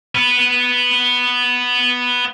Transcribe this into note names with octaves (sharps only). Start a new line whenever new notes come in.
B3 B4